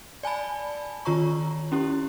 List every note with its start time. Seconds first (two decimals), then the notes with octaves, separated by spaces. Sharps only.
0.23 D5 G#5 A5 B5
1.05 D#3 F4 C#5 A#5 C#6
1.72 C#4 E4 G4